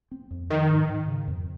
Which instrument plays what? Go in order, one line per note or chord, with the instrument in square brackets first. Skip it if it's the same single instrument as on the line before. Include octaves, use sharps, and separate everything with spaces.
[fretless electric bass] C4
F2
[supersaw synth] D#3 [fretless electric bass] F3
[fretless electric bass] G#2
G#2
C#3
F2